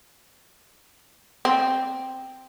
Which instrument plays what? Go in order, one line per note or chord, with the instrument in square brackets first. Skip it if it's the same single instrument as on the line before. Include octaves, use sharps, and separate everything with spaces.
[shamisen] C4